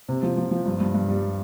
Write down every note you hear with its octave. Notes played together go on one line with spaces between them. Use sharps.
C3
F3
F3
F3
G2
G2
G2
G3